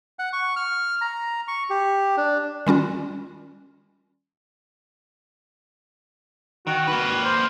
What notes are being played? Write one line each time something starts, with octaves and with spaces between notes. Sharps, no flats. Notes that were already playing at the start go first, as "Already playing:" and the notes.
F#5
C#6
F6
A#5
C#6
G4
D4
D#3 G3 C#4 F4
D#3 F#4
A#3 B4
C5